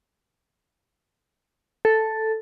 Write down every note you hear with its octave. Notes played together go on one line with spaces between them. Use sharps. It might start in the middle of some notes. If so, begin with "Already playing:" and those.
A4